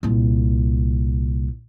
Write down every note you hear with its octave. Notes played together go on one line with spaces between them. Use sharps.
C2 A#2